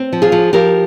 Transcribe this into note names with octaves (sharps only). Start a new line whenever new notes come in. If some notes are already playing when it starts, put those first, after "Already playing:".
Already playing: C4
F3
F4 G#4
F3
F3 G4 A#4